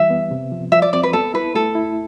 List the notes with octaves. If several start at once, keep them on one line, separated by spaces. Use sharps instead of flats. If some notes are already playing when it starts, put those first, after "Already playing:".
Already playing: E3 G3 E5
B3
C3
F3
F3 E5
D5
C4 D5
B4
B3 A4
E4 B4
A3 A4
E4